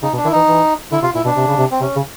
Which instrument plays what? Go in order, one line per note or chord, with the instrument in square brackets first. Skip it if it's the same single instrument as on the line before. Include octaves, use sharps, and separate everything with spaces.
[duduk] C#3 [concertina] D#4
[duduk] B2
[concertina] D4
[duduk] D#3 [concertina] E4
[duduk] E3 [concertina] D#4
[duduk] E3
[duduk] D3 [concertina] E4
[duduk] C3 [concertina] F4
[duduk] A#2 [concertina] E4
[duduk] B2 [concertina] D4
[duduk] C3
C#3
C3
[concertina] C4
[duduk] C3 [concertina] C#4
[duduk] C#3